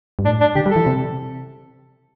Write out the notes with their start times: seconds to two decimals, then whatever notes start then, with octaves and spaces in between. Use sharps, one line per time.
0.19 G2
0.25 A2 D4
0.41 D4
0.55 D3 G4
0.66 G3
0.71 A4
0.76 E3
0.86 C3